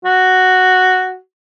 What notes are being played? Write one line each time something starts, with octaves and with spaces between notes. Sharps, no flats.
F#4